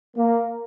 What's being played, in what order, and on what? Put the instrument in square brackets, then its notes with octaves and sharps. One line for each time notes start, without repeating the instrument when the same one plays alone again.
[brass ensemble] A#3